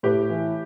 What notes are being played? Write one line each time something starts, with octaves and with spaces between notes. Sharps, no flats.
A2 G4 B4
E3